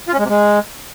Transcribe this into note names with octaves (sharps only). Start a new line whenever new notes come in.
F4
C#4
G#3
C3
G#3